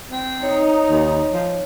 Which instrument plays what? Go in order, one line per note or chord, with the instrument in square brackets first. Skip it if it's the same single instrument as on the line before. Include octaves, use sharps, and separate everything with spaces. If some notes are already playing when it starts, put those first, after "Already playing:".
[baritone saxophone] C4
[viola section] D#4 [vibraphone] C#5
[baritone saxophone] D#2
F3